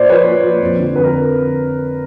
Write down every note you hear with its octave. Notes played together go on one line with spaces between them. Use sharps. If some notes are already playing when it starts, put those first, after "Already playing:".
Already playing: A#2 C5 D5
F3 B4 C#5
A#2
F3
F2
D3 F3
F2 B4
A#4